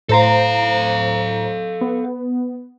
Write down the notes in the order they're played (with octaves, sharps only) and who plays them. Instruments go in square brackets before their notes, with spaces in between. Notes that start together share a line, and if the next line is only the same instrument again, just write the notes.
[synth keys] A2 C5 A#5 [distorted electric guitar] A4 F5
[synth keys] B3